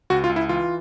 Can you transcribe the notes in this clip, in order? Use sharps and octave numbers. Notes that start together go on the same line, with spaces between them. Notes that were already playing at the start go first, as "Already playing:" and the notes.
C#2 F#4
F4
C#2
E4
E3 F4